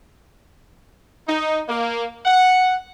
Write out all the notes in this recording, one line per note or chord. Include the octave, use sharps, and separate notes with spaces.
D#4
A#3
F#5